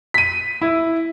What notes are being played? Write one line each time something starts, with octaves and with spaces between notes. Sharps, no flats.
B6 D#7
E4